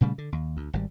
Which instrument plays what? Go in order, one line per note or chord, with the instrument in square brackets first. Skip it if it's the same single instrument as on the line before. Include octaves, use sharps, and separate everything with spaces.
[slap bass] A#2 C#3 G3 A3
D3
D#2
D2
G#1 C3 G3